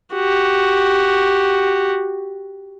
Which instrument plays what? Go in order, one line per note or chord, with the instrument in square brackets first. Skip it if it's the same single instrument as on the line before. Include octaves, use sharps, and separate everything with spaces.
[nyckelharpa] F#4 G4